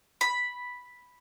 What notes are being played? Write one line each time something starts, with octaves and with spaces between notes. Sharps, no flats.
B5